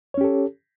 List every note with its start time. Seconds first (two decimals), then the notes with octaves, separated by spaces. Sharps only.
0.14 C#5
0.18 C#4
0.21 G4
0.24 A4